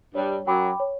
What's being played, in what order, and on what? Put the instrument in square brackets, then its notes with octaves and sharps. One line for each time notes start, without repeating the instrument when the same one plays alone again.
[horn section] G2 G3 [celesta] C#5
[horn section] F#2 F#3 [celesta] G5 B5 D6
[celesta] C#5